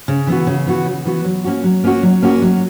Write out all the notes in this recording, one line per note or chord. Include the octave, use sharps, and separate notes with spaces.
C#3
E3 B3 F#4
C#3
E3 B3 F#4
C#3
E3 B3 F#4
F#3
A#3 C#4 F#4
F#3
A#3 C#4 F#4
F#3
A#3 C#4 F#4
F#3